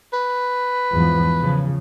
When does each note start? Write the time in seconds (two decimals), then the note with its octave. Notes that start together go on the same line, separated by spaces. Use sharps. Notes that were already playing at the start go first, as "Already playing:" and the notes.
0.13 B4
0.92 E2 G#2 F3
1.40 C#3 F3